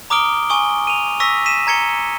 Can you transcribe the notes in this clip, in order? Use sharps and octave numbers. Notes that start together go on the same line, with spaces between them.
A#5 D6 D#6 F6 D7 G7
G#5 C#6 D#6 G7
D#7 F7
C#6 E6 A#6 B6
B6 D#7 E7
A#5 G#6 C#7 G7